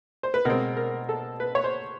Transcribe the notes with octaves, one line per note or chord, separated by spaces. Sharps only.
C5
B4
B2 G#3 C4 A#4
A#4
A4
B4
C#5
C5